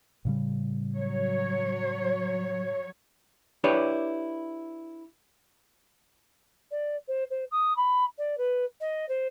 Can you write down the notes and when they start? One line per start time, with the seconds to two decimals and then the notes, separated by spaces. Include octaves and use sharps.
0.25 A2 C#3 G3
0.94 F#3 C#5
3.64 D4 E4 G4 B4 C#5 D5
6.71 D5
7.08 C5
7.30 C5
7.51 D#6
7.77 B5
8.18 D5
8.38 B4
8.81 D#5
9.09 C5